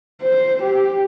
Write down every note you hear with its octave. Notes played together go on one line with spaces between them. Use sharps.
C5
G4